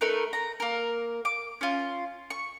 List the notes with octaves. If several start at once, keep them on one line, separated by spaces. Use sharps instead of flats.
A3 D#4 A#4 B4
A#5
A#3 A#4
D6
C#4 F4
C#6